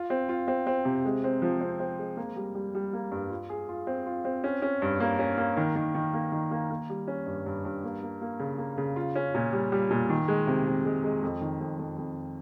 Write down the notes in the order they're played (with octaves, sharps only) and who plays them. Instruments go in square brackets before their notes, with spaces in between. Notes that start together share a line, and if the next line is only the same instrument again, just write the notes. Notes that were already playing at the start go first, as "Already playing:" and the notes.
Already playing: [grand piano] F4
C4
F4
C4
C4
C3
G#3
C4
F3
C4
C4
G#3
A#3
G3
G3
G3
A#3
G2
F4
G#4
F4
C4
F4
C4
C#4
C#4
G2
A#3
C#4
A#3
D#3
D#3
D#3
A#3
D#3
A#3
A#3
G3
C#4
G2
G2
G2
A#3
A#3
A#3
C#3
A#3
C#3
F4
C#4
A#2
G3
G3
A#2
D#3
G#3
C3
C3
G#3
G#3
F2
D#3
F2
F2
F2